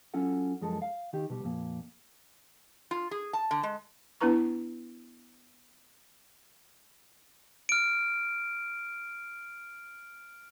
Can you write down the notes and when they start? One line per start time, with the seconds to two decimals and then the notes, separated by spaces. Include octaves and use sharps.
0.14 F#3 C#4 F4 A4 F#5
0.61 F#2 F3 G#3 A4
0.82 F5
1.13 D#3 G4
1.30 B2 G3
1.44 F2 A#2
2.91 F4
3.11 G#4
3.33 A5
3.51 D3
3.63 G#3
4.21 B3 D4 E4 B4 A#5 C#6
7.69 F6 D7